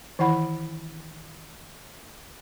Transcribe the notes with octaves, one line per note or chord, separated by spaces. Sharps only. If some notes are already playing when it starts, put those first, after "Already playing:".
D#3 E3 E4 F#5 B5